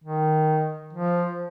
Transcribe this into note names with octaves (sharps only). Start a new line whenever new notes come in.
D#3
F3